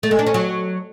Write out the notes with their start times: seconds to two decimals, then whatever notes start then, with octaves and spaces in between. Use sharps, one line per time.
0.03 A3
0.11 G#3
0.19 D4
0.27 C#4
0.34 F#3